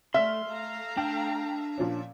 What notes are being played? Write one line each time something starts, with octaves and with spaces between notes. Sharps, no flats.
A3 E5 C6 F6
A3 F5 A#5
D4 G5
A#2 F3 C#4